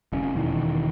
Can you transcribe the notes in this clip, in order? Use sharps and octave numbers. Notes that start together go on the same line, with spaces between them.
F1 C#4
E1 E2 D#3